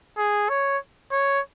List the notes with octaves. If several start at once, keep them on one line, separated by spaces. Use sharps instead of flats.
G#4
C#5
C#5